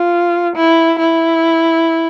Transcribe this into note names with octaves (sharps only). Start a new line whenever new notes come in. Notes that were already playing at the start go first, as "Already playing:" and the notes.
Already playing: F4
E4
E4